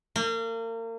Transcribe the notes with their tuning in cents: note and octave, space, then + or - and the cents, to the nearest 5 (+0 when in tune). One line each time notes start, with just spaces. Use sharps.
A#3 -35